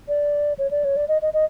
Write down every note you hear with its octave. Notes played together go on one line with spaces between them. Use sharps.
D5
C#5
D5
C#5
D5
D#5
D#5
D#5